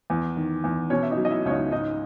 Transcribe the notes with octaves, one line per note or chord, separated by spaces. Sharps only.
E2
D#3
E2
B2 C#4 C#5
E5
D#4 D#5
F#3
D#5
E4 E5
C#2 C#5
D#4 D#5
G#2 D#4 D#5